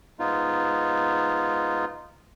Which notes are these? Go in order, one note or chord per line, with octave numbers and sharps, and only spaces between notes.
G#2 B3 D#4 F4